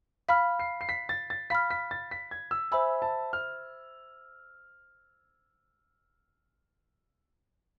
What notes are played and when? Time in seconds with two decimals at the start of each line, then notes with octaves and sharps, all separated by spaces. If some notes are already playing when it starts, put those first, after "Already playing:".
0.29 F5 B5 F6 B6
0.59 C7
0.81 C7
0.89 B6
1.09 A6
1.30 A6
1.50 F5 B5 F6 B6
1.71 B6
1.91 A6
2.11 B6
2.31 G#6
2.51 E6
2.72 C5 E5 G#5 B5 E6
3.02 A5
3.33 F6